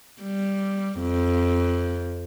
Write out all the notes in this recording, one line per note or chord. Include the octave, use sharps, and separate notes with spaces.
G3
F2